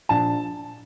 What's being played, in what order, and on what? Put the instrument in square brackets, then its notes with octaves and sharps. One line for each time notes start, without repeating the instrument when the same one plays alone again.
[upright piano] A#1 A5